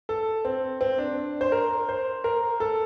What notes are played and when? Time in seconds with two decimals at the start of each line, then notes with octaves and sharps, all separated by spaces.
0.09 A4
0.45 C4
0.81 C4
0.98 D4
1.41 C5
1.52 A#4
1.89 C5
2.24 A#4
2.60 A4